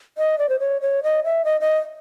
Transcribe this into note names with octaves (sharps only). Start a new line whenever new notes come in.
D#5
D5
C5
C#5
C#5
D#5
E5
D#5
D#5